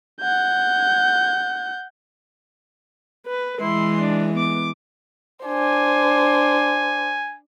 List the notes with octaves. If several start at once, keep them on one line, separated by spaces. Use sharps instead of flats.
F#5 G6
B4
E3 G#3 E4 C6
D4
B3 D6
D4 C5 G#5